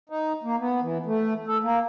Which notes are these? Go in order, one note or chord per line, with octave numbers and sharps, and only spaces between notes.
D#4
A#3
B3
E3
A3
A4
A#3